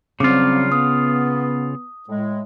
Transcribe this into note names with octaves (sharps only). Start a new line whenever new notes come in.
C#3 F#3 G3 C4 F4 D6
B3 D#6
A2 G#3